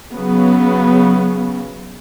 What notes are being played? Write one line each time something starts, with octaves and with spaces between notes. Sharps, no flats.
C#3 F#3 B3